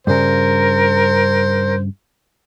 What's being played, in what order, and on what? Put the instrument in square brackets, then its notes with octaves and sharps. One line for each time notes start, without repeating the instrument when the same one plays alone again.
[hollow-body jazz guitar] G2 C#3 [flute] A#4 [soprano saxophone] C5